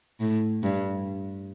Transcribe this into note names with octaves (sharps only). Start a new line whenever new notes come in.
A2
G2